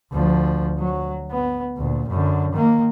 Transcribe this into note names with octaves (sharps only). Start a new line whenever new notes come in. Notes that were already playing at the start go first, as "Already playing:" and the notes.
D2 F3
F#3
B3
D2 A#2
F#2 D3
D#3 A#3